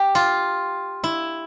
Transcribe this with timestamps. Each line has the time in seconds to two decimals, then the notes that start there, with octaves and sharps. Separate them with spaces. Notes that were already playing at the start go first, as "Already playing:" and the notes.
Already playing: G4
0.15 F4
1.04 E4